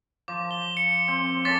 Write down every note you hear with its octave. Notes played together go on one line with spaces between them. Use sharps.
F3 D6
G7
C#7
C4
C#4 A4 D6 A6 B6